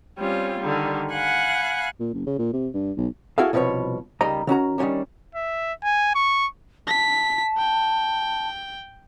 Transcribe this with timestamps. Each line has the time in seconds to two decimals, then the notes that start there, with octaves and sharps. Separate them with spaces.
0.18 G3 C4 C#4 F4
0.59 D3 D#3 G3
1.13 F5 F#5 G#5 B5 F#6
2.00 A#2
2.14 F#1
2.26 C#3
2.39 A#2
2.53 C3
2.74 G2
2.97 B1
3.38 E4 F#4 G#4 A4 F5
3.53 C2 B2 F3 B4 C#5
4.21 C#2 D#3 G3 D#5 A#5
4.47 D#3 C#4 F#4 A#5
4.78 D#3 G3 G#3 C#4 D4
5.35 E5
5.83 G#5
6.15 C#6
6.87 A5 B6
7.58 G5